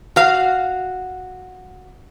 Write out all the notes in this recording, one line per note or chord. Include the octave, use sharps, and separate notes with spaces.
F#4 F5